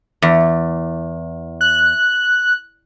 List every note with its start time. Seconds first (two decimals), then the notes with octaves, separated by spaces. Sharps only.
0.22 E2
1.61 F#6